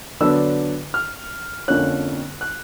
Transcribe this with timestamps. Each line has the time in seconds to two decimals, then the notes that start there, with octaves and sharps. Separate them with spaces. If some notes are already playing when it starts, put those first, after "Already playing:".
0.20 D3 F#3 B3 D4 E6
0.94 F6
1.68 F2 D3 F3 A#3 C#4 F#6
2.41 F#6